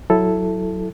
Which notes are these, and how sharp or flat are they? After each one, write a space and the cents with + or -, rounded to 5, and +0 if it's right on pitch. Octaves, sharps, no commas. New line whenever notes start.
F#3 +0 E4 +0 A4 +0